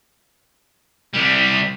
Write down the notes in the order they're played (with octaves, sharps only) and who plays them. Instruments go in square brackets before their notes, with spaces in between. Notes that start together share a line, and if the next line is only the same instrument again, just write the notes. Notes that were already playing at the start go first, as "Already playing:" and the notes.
[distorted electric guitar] C2 G3